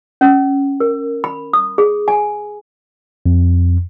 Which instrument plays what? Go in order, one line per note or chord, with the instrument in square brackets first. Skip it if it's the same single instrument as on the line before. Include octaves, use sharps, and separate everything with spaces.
[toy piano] C#4
A#4
B5
D#6
G#4
G#5
[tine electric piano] F2